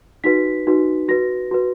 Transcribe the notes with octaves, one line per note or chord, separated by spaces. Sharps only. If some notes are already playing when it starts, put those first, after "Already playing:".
D#4 F#4 B4 B6
D#4 F#4 B4
F#4 B4 A#6
F#4 B4